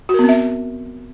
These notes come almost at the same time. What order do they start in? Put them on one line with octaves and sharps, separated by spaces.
F#4 A#4 B3 C4 E5